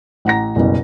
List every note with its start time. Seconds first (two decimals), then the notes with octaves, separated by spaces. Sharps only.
0.25 A1 F#5 A#5 A#6
0.56 F#1 C2 B2